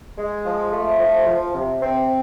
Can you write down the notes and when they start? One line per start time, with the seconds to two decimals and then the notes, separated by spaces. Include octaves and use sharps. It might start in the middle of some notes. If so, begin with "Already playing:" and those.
0.18 G#3
0.46 F3
0.73 A3
1.00 F3
1.27 F3
1.55 C3
1.82 C4